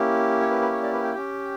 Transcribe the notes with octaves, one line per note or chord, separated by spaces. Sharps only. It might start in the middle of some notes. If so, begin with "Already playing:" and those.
Already playing: A#3 C#4 E4 G4
C#5
B4
B4
C#5
D5
B4
G5
C#4 G4